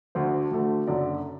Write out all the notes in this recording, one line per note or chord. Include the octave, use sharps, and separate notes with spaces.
D2 D3 A3 C5
D2 D3 A3
F#1 F#2 D3 D5